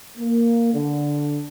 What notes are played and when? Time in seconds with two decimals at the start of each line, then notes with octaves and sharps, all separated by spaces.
0.17 A#3
0.74 D3